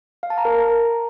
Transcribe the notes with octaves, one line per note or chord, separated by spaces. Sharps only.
F5
A5
A#5
A#4
A#5